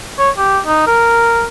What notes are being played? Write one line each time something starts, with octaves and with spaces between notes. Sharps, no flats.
C#5
G4
D#4
A#4